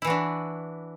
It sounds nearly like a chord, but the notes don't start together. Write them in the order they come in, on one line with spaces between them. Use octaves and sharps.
E4 E3 F#4 D4